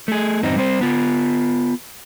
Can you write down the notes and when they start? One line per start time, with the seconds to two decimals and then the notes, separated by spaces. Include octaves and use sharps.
0.08 A3 G#4
0.43 E2 G2 C4 D#4
0.56 G3 C4 C5
0.81 B3 F4